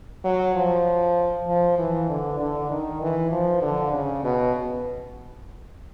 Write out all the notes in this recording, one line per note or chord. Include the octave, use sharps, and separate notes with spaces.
F#3
F3
F3
E3
D3
D3
D#3
E3
F3
D3
C#3
B2